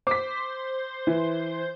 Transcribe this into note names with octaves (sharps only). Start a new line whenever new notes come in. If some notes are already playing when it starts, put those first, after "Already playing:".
C5 D6 B6
E3